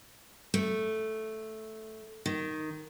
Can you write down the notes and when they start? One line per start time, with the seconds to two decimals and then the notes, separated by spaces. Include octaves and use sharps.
0.54 A3
2.26 D#3